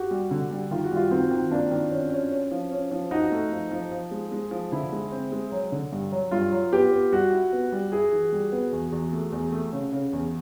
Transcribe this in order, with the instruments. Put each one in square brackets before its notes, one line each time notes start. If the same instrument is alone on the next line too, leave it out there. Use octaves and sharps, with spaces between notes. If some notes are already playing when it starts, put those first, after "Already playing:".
Already playing: [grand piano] F#4 G4
[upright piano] G3
D3
G3
[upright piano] D#3 [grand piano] F4
[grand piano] F#4
[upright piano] G3 [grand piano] F4
[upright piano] D#3 [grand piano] C4
[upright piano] D#3
[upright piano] A#3 [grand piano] D4
[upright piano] D#3
C#4
C#4
C#4
F3
C#4
F3
[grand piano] D#4 [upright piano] F#4
[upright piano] A3
F3
F3
F3
G#3
G#3
F3
[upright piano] D3 [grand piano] E4
[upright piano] G#3
C4
G#3
F#3
D3
G2
F#3
[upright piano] G2 [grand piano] F4
[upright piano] F#3
[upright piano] B3 [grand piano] G4
[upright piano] B3
[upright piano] G3 [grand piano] F#4
[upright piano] E4
B3
G3
[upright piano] E4 [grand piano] G#4
[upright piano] E3
G3
B3
E2
E2
A3
E2
A3
C#3
C#3
E2